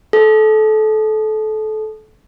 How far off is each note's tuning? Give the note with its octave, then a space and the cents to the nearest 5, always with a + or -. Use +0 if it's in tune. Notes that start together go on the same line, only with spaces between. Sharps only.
A4 -25